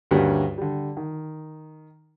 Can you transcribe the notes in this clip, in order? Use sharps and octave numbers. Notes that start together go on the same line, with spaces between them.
D2 G2 G3 A#3 C#4 F#5
D3 G3
D#3